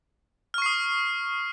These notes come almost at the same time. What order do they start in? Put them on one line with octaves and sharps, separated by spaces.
F6 C#6 C7 D#6